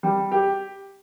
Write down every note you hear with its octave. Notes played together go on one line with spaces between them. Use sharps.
G3
G4